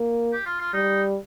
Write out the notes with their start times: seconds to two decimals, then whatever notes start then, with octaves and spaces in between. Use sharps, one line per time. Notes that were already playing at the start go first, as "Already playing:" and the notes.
Already playing: A#3
0.33 G4
0.46 F4
0.60 F4
0.73 G3 D#4